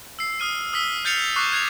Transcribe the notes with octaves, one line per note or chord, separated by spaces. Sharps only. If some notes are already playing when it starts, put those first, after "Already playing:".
E6 C7
D#6 F6 D#7
D#6 E6 B6 G7
F6 G6 A6 C7 C#7 F7
C#6 D6 F#6 C7
F#6 G#6 C7 F7